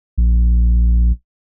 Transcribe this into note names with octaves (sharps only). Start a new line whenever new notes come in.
A#1